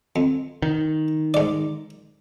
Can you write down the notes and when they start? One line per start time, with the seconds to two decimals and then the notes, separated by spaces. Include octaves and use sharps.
0.16 F2
0.62 D#3
1.34 G#2 D5